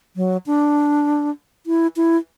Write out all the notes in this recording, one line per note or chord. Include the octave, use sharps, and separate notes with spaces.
F#3
D4
E4
E4